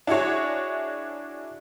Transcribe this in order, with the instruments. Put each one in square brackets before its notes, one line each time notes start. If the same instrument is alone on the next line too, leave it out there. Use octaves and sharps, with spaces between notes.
[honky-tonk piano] D4 E4 F#4 G#4 C#5